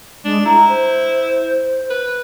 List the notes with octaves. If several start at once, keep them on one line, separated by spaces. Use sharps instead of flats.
G#3 D4
E4 A#5
C5
B4